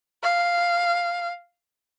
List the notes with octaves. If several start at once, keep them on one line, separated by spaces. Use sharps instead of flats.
F5